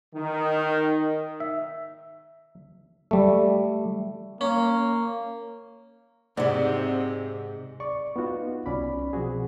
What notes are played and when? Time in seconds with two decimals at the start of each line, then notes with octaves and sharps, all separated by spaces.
0.14 D#3
1.40 E5
3.11 G3 A3
4.41 A#3 C#4
6.37 G#2 C3 C4 C5 D5 F#5
7.80 D5 C#6
8.16 B3 D#4 F4 F#4
8.66 C2 C#4 D5 B5
9.13 B2 F3 C4 F#4 G#4